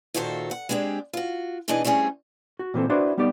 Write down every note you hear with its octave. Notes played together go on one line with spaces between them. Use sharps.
D#2 A#2 D#3 F#4 A4 C5
F#5
G#3 C4 D4 G4 G#4
F4 F#4
B2 E3 D4 D#4 G#4 D#5
G3 A3 C4 C#4 G#4
F#4
A#2 E3 C4 A4
D4 E4 F#4 B4 C5 D5
G3 B3 D#4 G4 D5